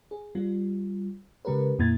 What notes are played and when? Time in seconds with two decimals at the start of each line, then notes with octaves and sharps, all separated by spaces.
0.11 G#4
0.35 G3 F4
1.45 C#3 G#3 G4 A#4 B4
1.79 F2 A#2 A#3 E4 G#6 A6